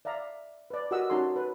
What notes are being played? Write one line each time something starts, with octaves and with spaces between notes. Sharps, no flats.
D5 E5 F5 A#5
B4 D5
F#4 G4 A#4 D#5 F#5 E6
C#4 D#4 F#4 A4 A#5 C6
B4